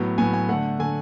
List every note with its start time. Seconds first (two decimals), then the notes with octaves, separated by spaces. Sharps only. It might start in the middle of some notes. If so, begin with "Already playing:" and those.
Already playing: A2 F#3 B3
0.18 A2 F#3 B3 G#5
0.33 G#5
0.49 D3 A3 F#5
0.79 D3 A3 G#5